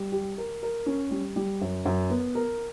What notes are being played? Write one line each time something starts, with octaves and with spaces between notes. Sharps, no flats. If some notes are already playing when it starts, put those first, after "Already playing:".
Already playing: G3
G4
A#4
A#4
C#4
G3
G3
F#2
F#2
B3
A#4